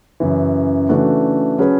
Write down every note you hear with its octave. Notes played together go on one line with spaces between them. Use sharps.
F#2 C#3 E3
C#3 E3 A3 D4 F#4
F#3 C#4 G#4 B4